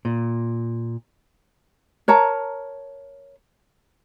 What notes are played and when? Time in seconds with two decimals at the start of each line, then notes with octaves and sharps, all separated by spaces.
0.05 A#2
2.08 A#4 C#5 A5 A#5